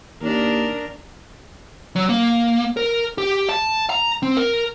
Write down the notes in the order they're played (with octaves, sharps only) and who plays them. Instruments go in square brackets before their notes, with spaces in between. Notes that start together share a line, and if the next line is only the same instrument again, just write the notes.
[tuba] D#2 [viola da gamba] D#3 D4 A#4
[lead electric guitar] F#3
A#3
A#4
G4
A5
A#5
C4
A#4